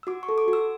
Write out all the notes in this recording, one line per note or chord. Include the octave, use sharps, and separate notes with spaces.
E6
F#4 D6
C#6
A4
D6
F#4
E6